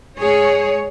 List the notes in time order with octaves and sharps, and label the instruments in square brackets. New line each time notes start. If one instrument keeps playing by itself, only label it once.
[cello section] G#2 G#3 G#4 C#5